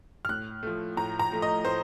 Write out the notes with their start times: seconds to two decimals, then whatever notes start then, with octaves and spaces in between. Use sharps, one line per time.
0.25 F6
0.29 A2 F#6
0.63 F3 A3
0.97 A2 A#5
1.19 A#5
1.31 F3 A3
1.42 D#5
1.65 A2 C5